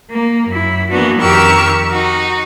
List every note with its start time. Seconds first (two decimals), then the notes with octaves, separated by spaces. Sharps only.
0.10 A#3
0.47 F#2 E4
0.89 E3 A#3 B3 D4 F#4
1.19 F2 D#3 G4 A#4 C#6 E6
1.90 D#4 F#4